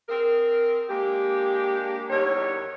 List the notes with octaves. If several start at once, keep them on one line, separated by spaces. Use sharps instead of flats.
C4 G#4 A#4
G#3 A#3 D4 G4
E2 D#3 G3 C#5